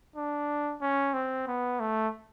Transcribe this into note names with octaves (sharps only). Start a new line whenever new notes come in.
D4
C#4
C4
B3
A3